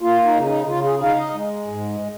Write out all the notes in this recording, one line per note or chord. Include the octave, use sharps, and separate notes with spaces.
A#3 F4
D#4
C#3
D#4
C#3 F4
G#4
D#4 F5
D#5
G#3
G#2